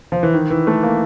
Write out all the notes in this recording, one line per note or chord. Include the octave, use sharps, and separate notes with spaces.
F3
E3
D#3
E3
A3
A#3